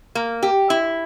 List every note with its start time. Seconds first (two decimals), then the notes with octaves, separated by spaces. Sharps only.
0.15 A#3
0.43 G4
0.70 E4